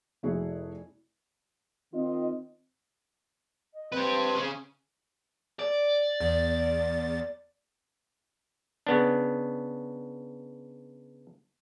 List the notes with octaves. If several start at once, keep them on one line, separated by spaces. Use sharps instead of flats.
F1 E4 F#4 G#4
D#3 C4 F4 D#5
D#5
C4 G4 B4
C#4 G#4
D5
E2 A6
C#3 B3 D4